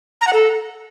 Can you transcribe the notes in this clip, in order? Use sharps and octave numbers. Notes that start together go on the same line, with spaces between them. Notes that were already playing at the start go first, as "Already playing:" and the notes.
A#5
F#5
A4